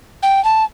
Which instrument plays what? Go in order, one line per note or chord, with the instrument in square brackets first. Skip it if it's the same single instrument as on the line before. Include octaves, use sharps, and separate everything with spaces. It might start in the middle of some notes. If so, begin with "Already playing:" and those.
[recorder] G5
A5